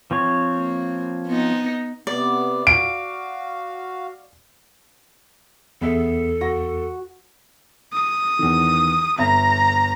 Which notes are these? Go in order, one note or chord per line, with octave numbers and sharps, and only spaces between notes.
F3 C4 C#5
A#3
B3 D#4
C3 B3 D5
F#4 F5 D7
E2 B3 G#4 A4 E5
F#4 A#6
D#6
E2 D#3
G1 E5 A#5 B5